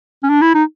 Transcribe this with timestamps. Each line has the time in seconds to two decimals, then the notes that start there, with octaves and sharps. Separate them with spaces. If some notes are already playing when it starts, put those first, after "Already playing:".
0.23 C#4
0.29 D4
0.42 E4
0.55 D#4